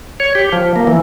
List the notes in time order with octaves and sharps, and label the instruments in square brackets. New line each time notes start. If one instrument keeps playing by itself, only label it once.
[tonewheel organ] C#5
G4
F3
A#3
E3